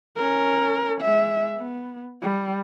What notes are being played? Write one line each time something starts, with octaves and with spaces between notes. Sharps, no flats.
C#4 A#4
G#3 E5
B3
G3